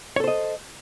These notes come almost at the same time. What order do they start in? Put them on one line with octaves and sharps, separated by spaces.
C#5 A4 C5 D#5